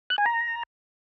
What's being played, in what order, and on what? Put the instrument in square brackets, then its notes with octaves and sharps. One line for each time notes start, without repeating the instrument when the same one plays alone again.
[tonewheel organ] F#6
G#5
A#5